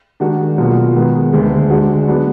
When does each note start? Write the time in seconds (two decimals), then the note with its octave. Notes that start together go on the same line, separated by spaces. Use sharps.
0.20 D#3 G#3 D4 F#4
0.58 B2 F#3 A#3 F4
0.95 D#3 G#3 B3
1.33 D2 D3 G#3
1.70 D3 G#3 D4 F#4
2.08 F#3 B3 D4